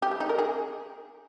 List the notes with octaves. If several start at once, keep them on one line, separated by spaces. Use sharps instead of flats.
G4
G3
D#4
A#4
G#4